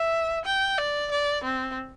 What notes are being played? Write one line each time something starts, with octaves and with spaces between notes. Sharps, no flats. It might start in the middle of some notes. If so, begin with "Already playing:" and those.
Already playing: E5
G5
D5
D5
C4